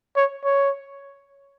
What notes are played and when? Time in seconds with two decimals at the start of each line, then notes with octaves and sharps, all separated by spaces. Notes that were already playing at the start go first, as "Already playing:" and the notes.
0.16 C#5
0.44 C#5